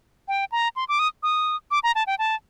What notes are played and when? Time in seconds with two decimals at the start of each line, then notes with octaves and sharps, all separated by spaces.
0.28 G5
0.52 A#5
0.76 C6
0.89 D6
0.99 D#6
1.23 D#6
1.71 D6
1.83 A#5
1.95 A5
2.07 G5
2.19 A5